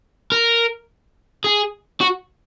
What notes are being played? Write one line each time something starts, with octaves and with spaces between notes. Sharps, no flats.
A#4
G#4
F#4